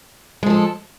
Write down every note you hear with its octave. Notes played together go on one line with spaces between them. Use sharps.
F3 G#3 A4